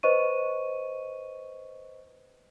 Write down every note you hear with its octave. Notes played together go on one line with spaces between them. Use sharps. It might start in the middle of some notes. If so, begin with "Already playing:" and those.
B4 C5 D#5 C#6 D#7